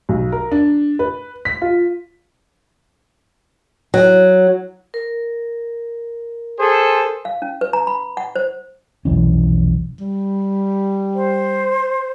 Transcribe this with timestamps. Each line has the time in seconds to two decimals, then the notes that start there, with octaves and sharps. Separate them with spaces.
0.09 B1
0.32 A#4
0.52 D4
0.99 B4
1.45 B6
1.62 F4
3.94 F#3
4.94 A#4
6.60 G#4 A4 C5
7.25 F5
7.42 C#4
7.61 B4
7.73 A#5
7.87 B5
8.17 F#5
8.36 C5
9.05 F1 B1 E3 C#4
10.00 G3
11.15 C5